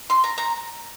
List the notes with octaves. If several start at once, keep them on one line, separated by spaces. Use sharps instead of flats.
C6
A#5
A#5